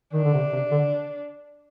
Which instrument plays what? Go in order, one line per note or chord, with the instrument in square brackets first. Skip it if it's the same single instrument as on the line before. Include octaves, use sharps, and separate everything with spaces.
[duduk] D#3 [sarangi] D4
[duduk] D3
C3
C3
D3